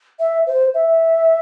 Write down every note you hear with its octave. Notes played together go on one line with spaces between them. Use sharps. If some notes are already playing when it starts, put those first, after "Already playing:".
E5
C5
E5